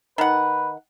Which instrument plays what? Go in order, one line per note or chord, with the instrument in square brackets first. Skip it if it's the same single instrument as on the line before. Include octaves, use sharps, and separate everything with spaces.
[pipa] D#3 F#5 [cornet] B4